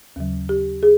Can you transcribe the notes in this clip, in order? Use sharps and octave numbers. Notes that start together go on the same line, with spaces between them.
D#2 C#3 F#3
G4
G#4